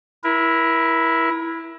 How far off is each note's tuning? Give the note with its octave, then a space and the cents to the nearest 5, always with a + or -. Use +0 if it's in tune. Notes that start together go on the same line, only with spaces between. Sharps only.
E4 +0 A#4 +35